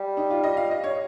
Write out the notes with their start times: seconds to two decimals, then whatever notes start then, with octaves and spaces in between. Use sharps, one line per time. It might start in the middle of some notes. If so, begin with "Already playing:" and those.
Already playing: G3
0.17 D#4
0.30 F4
0.44 D#5
0.57 F5
0.71 D#5
0.84 C#5